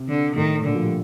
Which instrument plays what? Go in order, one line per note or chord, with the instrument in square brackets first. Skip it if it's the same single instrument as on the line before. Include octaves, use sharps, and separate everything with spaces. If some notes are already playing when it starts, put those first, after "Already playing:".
Already playing: [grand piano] C3 C4
[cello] D3
[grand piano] A2 A3 [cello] D#3
[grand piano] A#2 A#3 [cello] D3
[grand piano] F3 F4
G3 G4